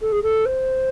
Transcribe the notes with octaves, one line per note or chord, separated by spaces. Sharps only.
A4
G#4
A4
C5